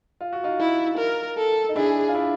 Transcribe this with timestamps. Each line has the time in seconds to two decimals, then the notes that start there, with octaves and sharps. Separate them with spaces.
0.21 F4
0.33 F#4
0.44 D#4 F4
0.60 E4
0.98 A#4
1.38 A4
1.69 D#4
1.76 D4 E4 G#4
2.08 F4
2.14 D4 E4